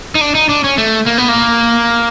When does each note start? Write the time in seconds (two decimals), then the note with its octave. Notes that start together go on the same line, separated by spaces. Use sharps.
0.15 D#4
0.21 D4
0.35 D#4
0.49 D4
0.64 C#4
0.78 A3
1.06 A#3
1.18 B3
1.28 A#3